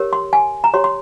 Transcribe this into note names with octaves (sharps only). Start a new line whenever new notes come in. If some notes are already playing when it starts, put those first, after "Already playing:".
Already playing: G4 A#4 C#5
C6
G#5
A#5
G4 C#5 C6
C6